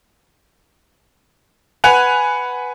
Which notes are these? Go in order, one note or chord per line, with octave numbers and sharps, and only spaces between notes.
B4 F#5 G#5 F#6 F7